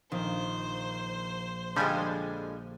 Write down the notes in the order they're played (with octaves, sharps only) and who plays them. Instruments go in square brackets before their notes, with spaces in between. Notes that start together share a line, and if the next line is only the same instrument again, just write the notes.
[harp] A#1 [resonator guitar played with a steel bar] D#3 [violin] C5
[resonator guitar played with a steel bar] D3 G#3 [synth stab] F3 G3 G#5